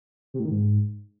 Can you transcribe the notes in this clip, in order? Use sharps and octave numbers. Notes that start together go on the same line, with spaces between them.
C3
A2
D#3
G#2